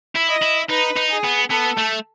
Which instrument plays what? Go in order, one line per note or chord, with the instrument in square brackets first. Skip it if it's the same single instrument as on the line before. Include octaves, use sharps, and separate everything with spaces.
[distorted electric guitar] E4
[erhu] D#5
[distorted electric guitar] E4
[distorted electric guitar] D#4 [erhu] B4
[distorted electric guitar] D#4
[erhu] G#4
[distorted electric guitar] B3
[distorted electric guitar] B3 [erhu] A4
[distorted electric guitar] A3